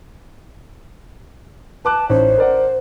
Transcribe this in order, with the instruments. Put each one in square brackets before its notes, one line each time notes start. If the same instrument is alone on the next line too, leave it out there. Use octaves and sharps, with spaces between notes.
[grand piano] B4 D6 F#6 [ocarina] A5
[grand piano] A1 C#4 D#4 [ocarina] C5
[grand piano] A#4 D5 F#5